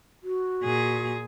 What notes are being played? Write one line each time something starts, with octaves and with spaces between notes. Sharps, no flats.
F#4
A#2 G#4